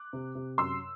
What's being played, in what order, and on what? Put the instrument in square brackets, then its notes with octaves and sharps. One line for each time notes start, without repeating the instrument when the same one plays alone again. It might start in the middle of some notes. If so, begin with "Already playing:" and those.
Already playing: [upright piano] D6 F#6
C3
C3
F#2 C6 E6